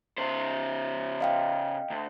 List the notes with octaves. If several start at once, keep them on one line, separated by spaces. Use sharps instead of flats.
C#3 C5
D#5 F5 G5
D2